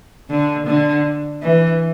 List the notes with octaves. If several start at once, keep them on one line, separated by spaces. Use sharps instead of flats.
D3
D3
E3